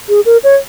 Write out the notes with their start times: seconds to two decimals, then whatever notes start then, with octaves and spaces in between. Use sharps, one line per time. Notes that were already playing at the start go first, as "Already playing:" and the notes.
0.09 G#4
0.26 A#4
0.44 C#5